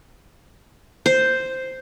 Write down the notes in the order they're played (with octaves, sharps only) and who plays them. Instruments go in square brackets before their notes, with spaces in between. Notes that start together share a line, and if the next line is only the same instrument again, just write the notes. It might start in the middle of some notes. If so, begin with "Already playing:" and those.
[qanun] C5